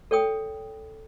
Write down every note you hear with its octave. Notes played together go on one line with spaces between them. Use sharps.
A4 C#5 G5 D#6